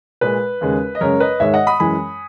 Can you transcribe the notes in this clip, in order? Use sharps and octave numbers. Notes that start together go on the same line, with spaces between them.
A#2 G#3 B4
D#2 C#3 G#3
D#5
F#2 C#3 G#3 A#4 C#5
B4 D#5
G#2 D#3 G#3 C#5 E5
D#5 F#5
B5 D#6
F#2 E3 G#3 G#5 B5